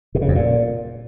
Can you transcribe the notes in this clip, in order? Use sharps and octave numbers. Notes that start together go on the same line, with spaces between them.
B2
C#3
F2
A#2